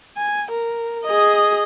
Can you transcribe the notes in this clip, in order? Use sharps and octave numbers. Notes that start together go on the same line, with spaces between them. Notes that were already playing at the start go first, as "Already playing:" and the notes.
G#5
A#4
G#4 D#5